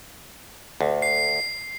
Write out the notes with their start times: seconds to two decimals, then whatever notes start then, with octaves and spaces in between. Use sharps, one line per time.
0.81 D2
1.02 C7